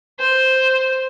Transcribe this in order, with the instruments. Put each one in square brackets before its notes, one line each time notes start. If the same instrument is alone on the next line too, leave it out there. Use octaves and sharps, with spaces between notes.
[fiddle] C5